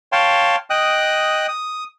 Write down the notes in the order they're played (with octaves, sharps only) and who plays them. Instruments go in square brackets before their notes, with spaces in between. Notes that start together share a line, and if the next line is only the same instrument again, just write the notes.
[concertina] C#5 F5 G5 A5 C6
D#5 G5 D#6 F#6
D#6